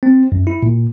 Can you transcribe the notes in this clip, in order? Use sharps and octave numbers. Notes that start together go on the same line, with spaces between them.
C4
F#2
E4
A#2